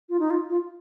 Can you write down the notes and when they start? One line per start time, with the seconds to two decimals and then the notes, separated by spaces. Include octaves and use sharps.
0.09 F4
0.19 D#4
0.30 F4
0.50 F4